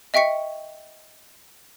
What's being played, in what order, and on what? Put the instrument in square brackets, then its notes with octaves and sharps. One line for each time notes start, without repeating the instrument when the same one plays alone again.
[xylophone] D#5 E5 G5 C#6 B6 C#7